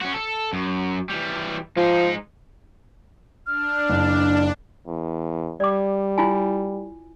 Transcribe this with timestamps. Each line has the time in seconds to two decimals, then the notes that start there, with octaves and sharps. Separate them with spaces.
0.02 C#4 F#4
0.14 A4
0.53 F#2
1.09 E3 G3
1.77 F3 G#3 D#4
3.47 D4 F6
3.90 F#1
4.87 E2
5.60 G3 D5 D6
6.18 E4 F4 G#5